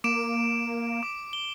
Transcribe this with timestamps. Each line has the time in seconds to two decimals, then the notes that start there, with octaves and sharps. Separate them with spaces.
0.04 A#3 D6 D7 E7
1.03 D6
1.33 G7